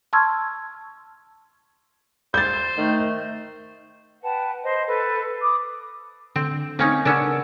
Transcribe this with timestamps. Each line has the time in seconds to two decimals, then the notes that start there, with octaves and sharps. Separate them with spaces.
0.13 A5 C6 C#6 E6 F6 G#6
2.34 C5 G6 A6
2.78 D#3 A3
4.22 B4 F#5 G5 A5
4.63 C5 D#5
4.85 A4 B4
5.41 D6 D#6
6.36 D3 C4
6.79 A#3 C4 C#4 D#4
7.05 C#3 B3 C#4 D4 A#4 E6